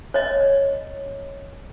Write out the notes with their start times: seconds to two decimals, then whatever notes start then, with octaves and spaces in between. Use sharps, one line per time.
0.14 C#5 D#5